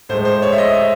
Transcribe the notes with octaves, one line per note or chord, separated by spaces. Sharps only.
A2 G#3 C5
C5
C#5
E5
D#5
D#5